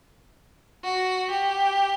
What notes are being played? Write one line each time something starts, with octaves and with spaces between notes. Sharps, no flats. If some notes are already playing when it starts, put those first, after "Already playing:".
F#4
G4